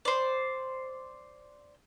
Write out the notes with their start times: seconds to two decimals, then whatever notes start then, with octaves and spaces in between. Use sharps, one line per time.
0.05 C5 D5